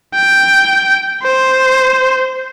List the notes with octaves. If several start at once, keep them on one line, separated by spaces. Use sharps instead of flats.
G5
C5